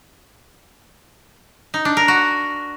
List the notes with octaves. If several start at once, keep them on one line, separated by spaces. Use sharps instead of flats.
D#4
D4
A#4
F#4